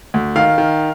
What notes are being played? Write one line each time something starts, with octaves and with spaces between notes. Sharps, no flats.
D2
D#3 F5
D#3